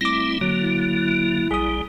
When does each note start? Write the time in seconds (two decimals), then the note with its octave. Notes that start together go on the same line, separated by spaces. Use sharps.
0.01 G3 A3 C4 E4 D6 A#6
0.41 D3 F#3 A#3
0.60 E4
1.51 A#1 G3 G#4 D#6